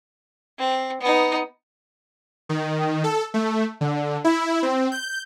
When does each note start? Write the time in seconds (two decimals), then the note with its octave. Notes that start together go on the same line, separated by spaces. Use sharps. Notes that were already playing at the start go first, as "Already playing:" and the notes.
0.59 C4
1.01 B3 D#4
2.49 D#3
3.04 A4
3.34 A3
3.81 D3
4.24 E4
4.63 C4
4.92 G6